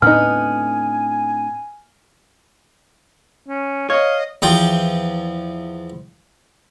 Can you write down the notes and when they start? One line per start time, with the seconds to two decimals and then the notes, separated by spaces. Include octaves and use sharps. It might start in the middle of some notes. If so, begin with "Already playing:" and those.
0.02 A2 B3 C4 D4 D#4 G#5 F6
3.48 C#4
3.90 C#5 D#5 F5
4.42 E2 F3 G5